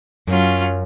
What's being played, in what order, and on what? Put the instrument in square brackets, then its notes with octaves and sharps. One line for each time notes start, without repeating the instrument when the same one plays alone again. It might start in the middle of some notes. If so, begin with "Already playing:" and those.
[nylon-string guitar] F#2 [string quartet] F#3 C#4 F4